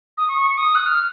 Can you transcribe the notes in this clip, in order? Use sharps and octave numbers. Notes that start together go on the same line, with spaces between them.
D#6
C#6
D#6
F#6
F6